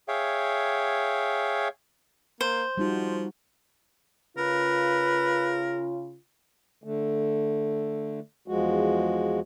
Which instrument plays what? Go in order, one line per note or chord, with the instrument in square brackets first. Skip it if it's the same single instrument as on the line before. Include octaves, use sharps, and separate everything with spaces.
[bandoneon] G#4 C#5 E5 F5 G5
[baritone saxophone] A#3 [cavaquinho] C5
[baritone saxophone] F3 [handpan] G3 D#4 F#4
[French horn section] C#3 F4 [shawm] A#4 [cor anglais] B4
[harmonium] D3 A3
E2 F3 G#3 F#4